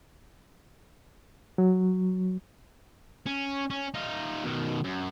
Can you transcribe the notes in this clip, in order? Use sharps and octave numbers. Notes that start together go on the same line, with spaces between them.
F#3
C#4
C#4
D#4 F4
B2 D#3
F#2